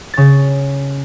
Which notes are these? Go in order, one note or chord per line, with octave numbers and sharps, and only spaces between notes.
C#3 A6